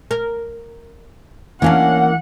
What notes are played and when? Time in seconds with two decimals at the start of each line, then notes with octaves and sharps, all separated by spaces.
0.11 A#4
1.62 E3 A#3 C#4 D4 F5 F#5